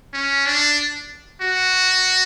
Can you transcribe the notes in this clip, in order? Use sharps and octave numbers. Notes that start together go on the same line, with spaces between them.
C#4
D4
F#4